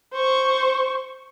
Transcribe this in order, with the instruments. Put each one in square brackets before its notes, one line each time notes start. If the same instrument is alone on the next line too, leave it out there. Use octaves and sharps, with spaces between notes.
[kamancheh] C5 C#6